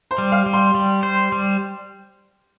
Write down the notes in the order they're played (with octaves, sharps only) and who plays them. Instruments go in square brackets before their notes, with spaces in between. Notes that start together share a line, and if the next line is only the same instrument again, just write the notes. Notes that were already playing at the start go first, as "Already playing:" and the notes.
[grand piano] C5
[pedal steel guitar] G3
[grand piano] F5
[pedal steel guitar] G3
[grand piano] C6
[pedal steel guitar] G3
C5
G3